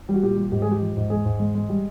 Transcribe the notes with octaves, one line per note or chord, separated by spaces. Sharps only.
G3
F#4
A#2 G4
G3
G#2 G4
G#3 G#4
G4
F3
G#2
G#3 G#4
G#2
G#3
G#3
G3